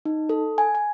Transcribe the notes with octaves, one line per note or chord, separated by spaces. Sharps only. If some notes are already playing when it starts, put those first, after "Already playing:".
D#4
A4
G#5
G#5